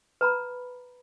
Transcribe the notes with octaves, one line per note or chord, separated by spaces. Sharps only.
B4 A#5 B5